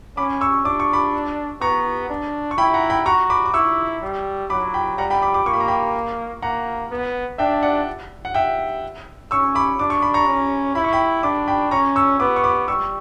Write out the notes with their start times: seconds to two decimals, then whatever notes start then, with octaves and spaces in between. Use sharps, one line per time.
0.17 C#4 B5 D6
0.41 C#6 E6
0.65 D4 D6
0.80 C#6
0.93 B5 D6
1.61 B3 A#5 C#6
2.09 D4
2.51 C#6
2.57 E4 G5 B5
2.74 F#5 A#5
2.90 G5 B5
3.06 F#4 A#5 C#6
3.30 B5 D6
3.45 D6
3.54 E4 C#6 E6
4.02 G3
4.50 F#3 B5 D6
4.74 G5 B5
4.98 G3 F#5 A#5
5.10 G5 B5
5.22 B5 D6
5.34 B5 D6
5.46 A#3 C#6
5.53 B5
5.61 A#5
5.68 G5 B5
6.42 A#3 F#5 A#5
6.91 B3
7.38 D4 E5 G5
7.63 D5 F#5
8.25 F#5
8.34 E5 G5
9.31 C#4 C#6 E6
9.55 B5 D6
9.79 D4 D6
9.90 C#6
10.02 B5
10.14 A#5 C#6
10.27 C#4
10.75 E4 B5
10.84 C#6
10.93 G5 B5
11.23 D4 B5 D6
11.48 G5 B5
11.71 C#4 A#5 C#6
11.96 C#6 E6
12.19 B3 B5 D6
12.36 C#6
12.44 B5 D6
12.68 G3 C#6 E6